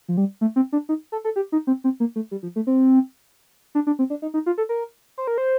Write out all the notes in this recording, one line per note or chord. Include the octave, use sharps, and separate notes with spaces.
F3
G3
A3
C4
D4
D#4
A4
A4
G4
D#4
C4
C4
A#3
A3
G3
F3
A3
C4
D4
D4
C4
D4
D#4
D#4
F4
A4
A#4
C5
A#4
C5